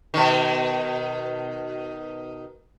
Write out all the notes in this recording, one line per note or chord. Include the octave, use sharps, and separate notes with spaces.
B2 D#3